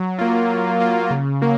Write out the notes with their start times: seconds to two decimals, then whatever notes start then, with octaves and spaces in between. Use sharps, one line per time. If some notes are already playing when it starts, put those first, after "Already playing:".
Already playing: F#3
0.19 A#3 F4
0.50 F#3
0.80 A#3 F4
1.11 C#3
1.41 F#3 A#3